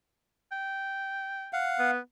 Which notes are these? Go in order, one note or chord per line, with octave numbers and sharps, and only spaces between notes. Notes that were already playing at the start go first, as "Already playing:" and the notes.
G5
F5 F#5
B3